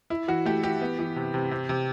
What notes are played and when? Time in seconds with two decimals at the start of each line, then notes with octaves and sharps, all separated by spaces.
0.10 E4
0.28 E3 F#4
0.46 A3 G4
0.64 E3 G4
0.81 B3
0.99 E3
1.16 C3
1.34 C3
1.51 C3
1.69 C3